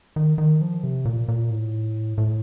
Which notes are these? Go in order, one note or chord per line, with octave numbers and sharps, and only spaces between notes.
D#3
D#3
F3
C3
A#2
A#2
A2
A2